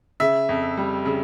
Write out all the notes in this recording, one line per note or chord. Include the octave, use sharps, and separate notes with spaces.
C#3 E5
F2
G3
C#3